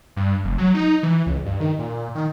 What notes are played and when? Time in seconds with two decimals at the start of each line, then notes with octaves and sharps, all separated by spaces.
0.16 G2
0.44 F1
0.58 F#3
0.74 D#4
1.03 E3
1.26 C#2
1.45 G2
1.60 D#3
1.79 A#2
2.15 D#3